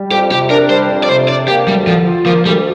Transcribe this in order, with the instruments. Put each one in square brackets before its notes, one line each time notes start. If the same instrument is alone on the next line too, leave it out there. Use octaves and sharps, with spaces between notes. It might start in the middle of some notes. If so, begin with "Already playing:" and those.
Already playing: [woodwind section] G3
[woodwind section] F2 [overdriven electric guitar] G4
[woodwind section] C3 [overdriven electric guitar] G4
[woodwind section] D4 [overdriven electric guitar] A#4
[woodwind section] G3 [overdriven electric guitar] C5
[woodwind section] F2
[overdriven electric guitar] D5
[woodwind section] C3 [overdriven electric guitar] C5
[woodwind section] D4 [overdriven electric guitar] D5
[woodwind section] A#3 [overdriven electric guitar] G4
[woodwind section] D2 [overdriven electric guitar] G3
[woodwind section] D3 [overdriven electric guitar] F3
[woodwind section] F4
[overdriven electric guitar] F3 [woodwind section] A#3
[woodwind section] D2 [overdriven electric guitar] G3